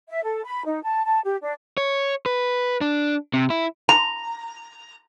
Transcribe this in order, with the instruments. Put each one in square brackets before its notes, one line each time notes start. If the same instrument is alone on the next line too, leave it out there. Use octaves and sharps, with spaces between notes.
[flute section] E5
A4
B5
D#4
A5
A5
G4
D4
[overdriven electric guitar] C#5
B4
D4
C3
E4
[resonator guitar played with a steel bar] A#5